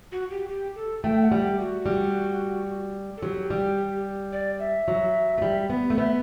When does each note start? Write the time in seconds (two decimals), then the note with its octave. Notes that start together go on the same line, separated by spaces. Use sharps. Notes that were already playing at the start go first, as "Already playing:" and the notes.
0.12 F#4
0.31 G4
0.49 G4
0.76 A4
1.04 A3 G5
1.22 F#5
1.32 G3
1.40 G4
1.59 F#4
1.86 G3
3.17 A4
3.22 F#3 G4
3.50 G3
4.32 D5
4.59 E5
4.88 F#3
5.38 A3
5.42 G3
5.70 B3
5.90 A3
5.97 B3 E5